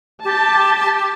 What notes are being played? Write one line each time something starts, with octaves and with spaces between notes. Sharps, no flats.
G4 A5